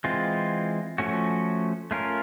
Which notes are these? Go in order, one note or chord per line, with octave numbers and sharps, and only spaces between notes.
E3 G#3 C4 F4
F3 A3 C#4 F#4
A3 C#4 F4 A#4